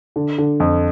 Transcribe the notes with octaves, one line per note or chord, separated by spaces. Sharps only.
D3
D3
F2